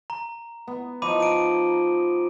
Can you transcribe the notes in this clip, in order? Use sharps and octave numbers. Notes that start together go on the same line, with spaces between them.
A#5
B3
F3 D#4 B5 D6 D#7
D7 D#7